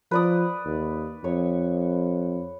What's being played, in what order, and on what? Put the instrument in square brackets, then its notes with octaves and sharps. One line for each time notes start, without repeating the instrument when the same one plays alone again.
[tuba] F3 [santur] B4 D5 D#6
[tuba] D#2
[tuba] F2 [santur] C#5